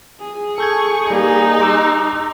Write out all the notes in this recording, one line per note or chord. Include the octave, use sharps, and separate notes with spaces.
G#4
A4 C#6 G6 G#6
G3 A#3 D#4 G4
C6 D6 E6